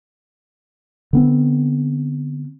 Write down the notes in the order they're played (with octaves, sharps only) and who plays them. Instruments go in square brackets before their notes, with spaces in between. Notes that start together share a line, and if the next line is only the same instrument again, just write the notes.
[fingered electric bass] D3 B3 C4